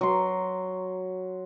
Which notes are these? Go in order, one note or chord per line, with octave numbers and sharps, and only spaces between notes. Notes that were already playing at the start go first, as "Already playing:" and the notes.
F#3 C6